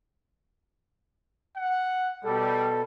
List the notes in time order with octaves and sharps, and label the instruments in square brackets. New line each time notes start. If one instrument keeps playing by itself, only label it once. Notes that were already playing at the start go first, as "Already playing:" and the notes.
[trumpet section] F#5
[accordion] B2 A4 [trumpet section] G3